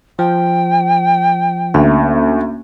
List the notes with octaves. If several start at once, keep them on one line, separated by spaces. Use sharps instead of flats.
F3 G5
D2 A#3 C#4 E5